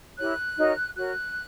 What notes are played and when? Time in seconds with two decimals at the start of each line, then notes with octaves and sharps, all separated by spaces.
0.18 E4 G4 A#4 C#5 F#6
0.57 D#4 F#4 A#4 C#5
0.96 F#4 A#4 C#5 F#6